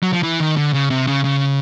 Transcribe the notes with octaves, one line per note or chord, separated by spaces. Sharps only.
F#3
F3
E3
D#3
D3
C#3
C3
C#3
C#3